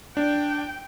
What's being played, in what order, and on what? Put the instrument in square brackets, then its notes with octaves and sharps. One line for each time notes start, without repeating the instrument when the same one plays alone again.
[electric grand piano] D4 [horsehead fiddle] G5